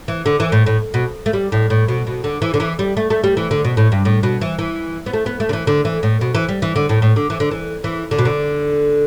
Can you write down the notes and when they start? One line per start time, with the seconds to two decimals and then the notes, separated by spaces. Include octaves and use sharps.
0.08 E3
0.26 D3
0.40 E3
0.52 A2
0.66 A2
0.94 B2
1.26 A3
1.33 G3
1.52 A2
1.70 A2
1.88 B2
2.07 B2
2.24 D3
2.42 E3
2.54 D3
2.60 E3
2.79 G3
2.97 A3
3.10 A3
3.24 G3
3.37 E3
3.51 D3
3.65 B2
3.77 A2
3.92 G2
4.05 A2
4.23 B2
4.41 E3
4.59 E3
5.06 B3
5.13 A3
5.26 B3
5.40 A3
5.49 D3
5.53 E3
5.67 D3
5.85 E3
6.03 A2
6.21 B2
6.35 E3
6.49 G3
6.62 E3
6.76 D3
6.89 A2
7.02 A2
7.16 D3
7.30 E3
7.40 D3
7.51 E3
7.84 E3
8.11 D3
8.18 B2
8.25 D3